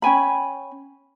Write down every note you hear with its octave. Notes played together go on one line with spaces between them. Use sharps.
C#4 G5 G#5 B5